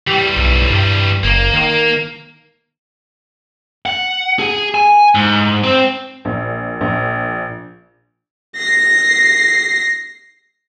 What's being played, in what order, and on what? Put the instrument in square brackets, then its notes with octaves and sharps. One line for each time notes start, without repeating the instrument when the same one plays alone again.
[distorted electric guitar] E3 G3 [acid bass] G4
[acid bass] B1
G2
[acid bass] F#1 [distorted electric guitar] A#3
[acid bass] D#3
[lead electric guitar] F#5
G#4
G#5
G#2
C4
[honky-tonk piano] A#1
A#1
[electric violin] A#6 C7